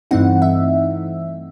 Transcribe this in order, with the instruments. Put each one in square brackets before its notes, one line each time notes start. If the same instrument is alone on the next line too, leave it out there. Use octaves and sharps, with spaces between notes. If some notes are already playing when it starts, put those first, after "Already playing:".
[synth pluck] G2 E3 A3 C4 D#4 F#5
E5